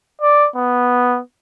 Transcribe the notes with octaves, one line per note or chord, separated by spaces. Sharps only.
D5
B3